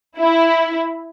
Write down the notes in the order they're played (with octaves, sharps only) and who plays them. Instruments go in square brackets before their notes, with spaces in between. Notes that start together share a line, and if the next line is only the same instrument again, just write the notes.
[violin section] E4